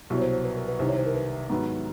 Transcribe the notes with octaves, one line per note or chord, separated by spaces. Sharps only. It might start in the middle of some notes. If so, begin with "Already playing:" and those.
C2 B2 F#3
C#5
C5
C5
B4
A#4
B4
C2 C3 D#3 C5
C#5
C5
A#4
B4
G#2 D#3 F#3 B3